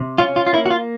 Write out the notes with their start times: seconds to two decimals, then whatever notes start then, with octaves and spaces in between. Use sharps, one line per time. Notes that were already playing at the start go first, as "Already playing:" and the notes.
Already playing: C3
0.18 C#4 F4
0.36 F4
0.47 F4
0.53 A#3 E4
0.66 F#4
0.70 F4